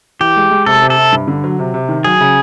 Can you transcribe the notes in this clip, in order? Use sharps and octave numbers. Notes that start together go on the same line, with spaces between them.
E3 G4
G#3
G#3
C3 A4
C3
A4
C3
G2
D3
F#3
C3
C3
D#3
F#3 G#4
C#3